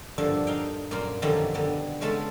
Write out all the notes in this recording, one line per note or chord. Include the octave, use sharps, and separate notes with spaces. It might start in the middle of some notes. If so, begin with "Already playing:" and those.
G2 A#2 D3 F3 D4 E4
D#4 F5 G5
F#2 A#2 A#3 F4
F#2 B2 D3 D#3 F3 G3
D3 G3 B3
C#3 G#3 A3 B3 A5 B5